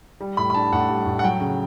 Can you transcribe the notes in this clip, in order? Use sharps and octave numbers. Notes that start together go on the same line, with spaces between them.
G3
A2 B5
B5
D4 A5
A2 F#5
G3
A2
F#5
F#3 G5
C#3